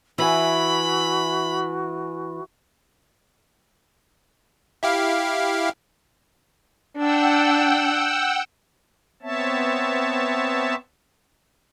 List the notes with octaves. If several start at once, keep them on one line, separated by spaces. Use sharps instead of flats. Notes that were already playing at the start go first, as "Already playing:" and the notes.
E3 F#4 E5 G#5 B5
E4 G4 F5
D4 F#5 G5 E6
B3 C4 C#5 E5 A5